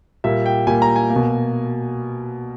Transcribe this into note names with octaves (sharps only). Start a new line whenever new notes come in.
A#2 G3 A#3 E5
G5
A#2 G3 A#3 G#5
A#5
G#5
A#3
B2